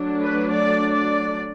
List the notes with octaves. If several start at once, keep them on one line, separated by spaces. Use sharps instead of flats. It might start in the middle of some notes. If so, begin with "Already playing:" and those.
Already playing: F#3 A3 D4
B4
D5
D5